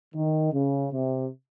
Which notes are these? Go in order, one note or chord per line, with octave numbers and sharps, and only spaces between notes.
D#3
C#3
C3